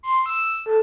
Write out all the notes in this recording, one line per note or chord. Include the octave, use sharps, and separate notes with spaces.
C6
E6
A4